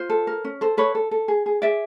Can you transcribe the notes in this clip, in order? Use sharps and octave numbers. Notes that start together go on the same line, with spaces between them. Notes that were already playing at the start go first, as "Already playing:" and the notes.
Already playing: F4 C5
A4
A#4
C#4
A4 C5
A4 B4 C#5
A4
A4
G#4
G#4
G#4 D5 E5